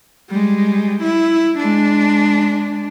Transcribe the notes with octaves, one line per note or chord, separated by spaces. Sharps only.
G3 G#3
E4
G#3 D4